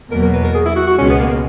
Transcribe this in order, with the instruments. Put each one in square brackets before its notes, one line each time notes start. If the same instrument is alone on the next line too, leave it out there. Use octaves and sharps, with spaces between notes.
[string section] E2 B2 F#3 A#3 [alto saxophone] A#4
[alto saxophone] A#4
B4
A#4
G#4
E4
F#4
F#4
[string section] C#2 B2 G#3 [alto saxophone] C#4
[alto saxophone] B3
A#3
A#3